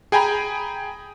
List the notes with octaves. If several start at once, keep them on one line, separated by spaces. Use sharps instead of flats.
G#4 G5 G#5 A#5 B5